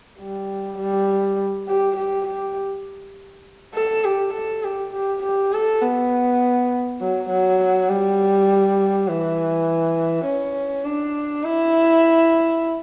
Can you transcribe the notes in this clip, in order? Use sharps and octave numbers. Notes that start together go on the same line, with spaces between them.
G3
G3
G4
G4
G4
A4
G4
A4
G4
G4
G4
A4
B3
F#3
F#3
G3
E3
C#4
D4
E4